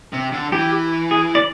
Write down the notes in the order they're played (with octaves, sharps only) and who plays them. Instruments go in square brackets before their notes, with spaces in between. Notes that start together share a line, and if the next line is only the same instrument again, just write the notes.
[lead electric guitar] C3
D3
[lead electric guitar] E3 [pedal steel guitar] G4
[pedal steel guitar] G#4
D5